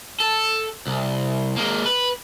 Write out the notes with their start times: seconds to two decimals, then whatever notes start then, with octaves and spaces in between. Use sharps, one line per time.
0.20 A4
0.87 C2
1.57 G#3 A#3
1.86 B4